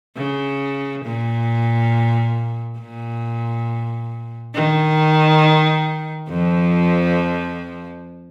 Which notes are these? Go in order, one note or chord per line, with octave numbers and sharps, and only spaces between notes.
C#3
A#2
A#2
D#3
F2 F3